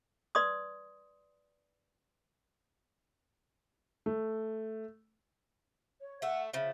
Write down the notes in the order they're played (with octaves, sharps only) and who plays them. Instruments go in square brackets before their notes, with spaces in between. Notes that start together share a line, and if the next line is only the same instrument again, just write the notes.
[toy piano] B4 D5 C6 D#6
[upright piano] A3
[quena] C#5
[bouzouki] A3 E5 [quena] F#5
[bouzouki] C#3 F3 [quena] E5